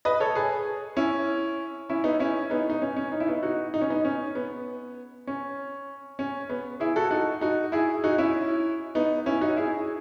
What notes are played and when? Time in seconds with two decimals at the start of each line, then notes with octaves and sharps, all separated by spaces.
0.05 B4 D#5
0.20 A4 C#5
0.35 G#4 B4
0.96 C#4 E4
1.90 C#4 E4
2.04 B3 D#4
2.19 C#4 E4
2.50 B3 D#4
2.70 D#4
2.82 C#4
2.96 C#4
3.12 D#4
3.20 E4
3.27 B3 D#4
3.43 D#4 F#4
3.74 D#4
3.81 C#4
3.89 B3 D#4
4.05 C#4
4.35 B3
5.27 C#4
6.19 C#4
6.49 B3
6.80 E4 G#4
6.96 F#4 A4
7.11 D#4 F#4
7.41 D#4 F#4
7.72 E4 G#4
8.04 D#4 F#4
8.18 C#4 E4
8.95 B3 D#4
9.26 C#4 E4
9.41 D#4 F#4
9.56 E4 G#4